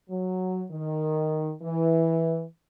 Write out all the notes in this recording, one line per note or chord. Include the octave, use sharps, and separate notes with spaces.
F#3
D#3
E3